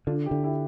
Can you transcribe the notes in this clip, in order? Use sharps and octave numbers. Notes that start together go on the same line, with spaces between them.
D3 D4 F4
E4 G4
D3
E4 G4